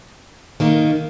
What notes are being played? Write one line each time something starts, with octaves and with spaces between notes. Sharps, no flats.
D#3 A#3 D#4